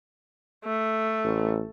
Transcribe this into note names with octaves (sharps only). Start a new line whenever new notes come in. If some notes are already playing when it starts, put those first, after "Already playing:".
A3
A1